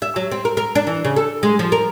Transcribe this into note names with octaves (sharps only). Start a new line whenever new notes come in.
E5
F#3
C4
A#4
A#4
D4
E3
C#3
A4
G#3
F3
A#4